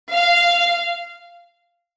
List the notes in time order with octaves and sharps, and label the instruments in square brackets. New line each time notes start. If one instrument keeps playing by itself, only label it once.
[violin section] F5